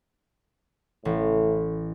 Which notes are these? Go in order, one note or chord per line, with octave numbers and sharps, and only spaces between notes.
A1 A2